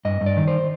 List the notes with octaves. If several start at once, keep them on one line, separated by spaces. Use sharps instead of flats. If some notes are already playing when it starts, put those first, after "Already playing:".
G2 D#5
G2
D5
D#3
C5